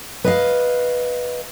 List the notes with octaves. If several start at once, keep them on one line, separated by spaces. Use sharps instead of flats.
B4 D#5 F5